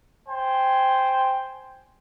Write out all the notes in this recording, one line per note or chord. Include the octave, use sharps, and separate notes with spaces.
C5 G5 G#5